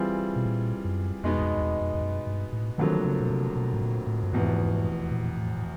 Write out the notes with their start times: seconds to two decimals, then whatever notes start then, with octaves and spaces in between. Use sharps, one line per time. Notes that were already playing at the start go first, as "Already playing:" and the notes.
Already playing: E3 G3 C4 F4 G#4
0.36 B2
0.46 A#2
0.85 F#2
1.24 F2 B2 G#3 B3 D#4
1.39 F#2
1.42 F2
1.57 F2
1.62 E2
1.81 F2
1.95 F2
2.01 F#2
2.27 G2
2.53 A2
2.78 F1 F2 D3 D#3 F#3 A#3
3.05 C#3
3.20 B2
3.30 C3
3.56 B2
3.74 A2
3.81 A#2
4.07 A2
4.23 G2
4.33 F1 E2 G#2 B2
5.11 A#2
5.37 A2
5.57 A2